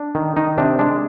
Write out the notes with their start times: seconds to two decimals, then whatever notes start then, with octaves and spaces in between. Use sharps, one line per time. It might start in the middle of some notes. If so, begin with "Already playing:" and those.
Already playing: D4
0.15 D#3
0.36 D#3 D#4
0.58 C3 D4
0.79 G#3 D4